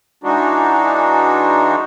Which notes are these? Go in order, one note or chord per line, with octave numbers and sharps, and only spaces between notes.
E3 G#3 D4 D#4 F#4